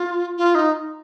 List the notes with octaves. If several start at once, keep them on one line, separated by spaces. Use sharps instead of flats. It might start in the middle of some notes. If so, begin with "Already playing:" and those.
Already playing: F4
F4
D#4